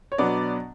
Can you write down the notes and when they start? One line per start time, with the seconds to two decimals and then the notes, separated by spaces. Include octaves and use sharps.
0.12 C#5
0.18 B2 F#3 B3 D4 D5